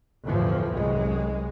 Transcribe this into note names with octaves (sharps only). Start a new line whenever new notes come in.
G1 E2 A2 E3 F3
C2 F#2 G#3